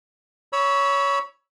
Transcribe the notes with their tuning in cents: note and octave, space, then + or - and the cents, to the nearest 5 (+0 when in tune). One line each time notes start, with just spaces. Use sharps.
C#5 +15 B5 -20 E6 -10